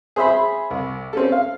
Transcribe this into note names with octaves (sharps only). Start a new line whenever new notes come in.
G#4 C5 E5 B5 C6
C2
C4 C#4 A4
F5